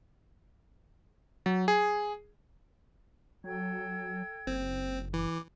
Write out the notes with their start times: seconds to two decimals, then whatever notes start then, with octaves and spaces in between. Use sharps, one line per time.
1.46 F#3
1.68 G#4
3.44 F#3 A4 G5 G#6
4.47 F#1 C4
5.14 E3 D6